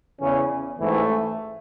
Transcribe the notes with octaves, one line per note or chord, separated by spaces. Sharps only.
E2 C#3 E3 C#4
A1 G#2 E3 A3